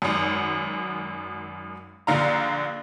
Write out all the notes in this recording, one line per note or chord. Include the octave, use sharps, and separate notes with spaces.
G#1 F#2
A#1 D3 F5 A#5